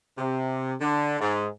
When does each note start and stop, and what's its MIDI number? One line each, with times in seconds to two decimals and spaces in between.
0.18 0.74 48
0.81 1.20 50
1.20 1.47 44